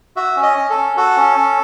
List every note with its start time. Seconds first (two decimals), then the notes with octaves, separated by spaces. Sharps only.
0.16 F#4 E5
0.37 C#4
0.43 D#5
0.57 C#4
0.70 A4
0.77 C#4
0.97 F#4 A4
1.17 C#4
1.37 C#4